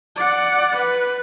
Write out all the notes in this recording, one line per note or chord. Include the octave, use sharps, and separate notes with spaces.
D5 F#5
B4